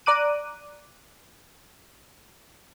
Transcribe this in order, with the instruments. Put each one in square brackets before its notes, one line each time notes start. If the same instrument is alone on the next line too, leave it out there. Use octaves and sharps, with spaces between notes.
[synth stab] D5 A#5 D6 F#6 D#7